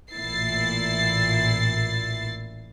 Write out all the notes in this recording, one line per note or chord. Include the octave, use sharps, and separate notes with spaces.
A1 A#2 E4 A6 C7